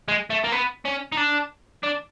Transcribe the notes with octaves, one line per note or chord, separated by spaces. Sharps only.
G#3
A3
A#3
B3
C#4
D#4
D4
D4